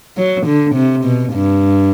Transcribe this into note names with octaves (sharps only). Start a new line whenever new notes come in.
F#3
D3
C3
B2
G2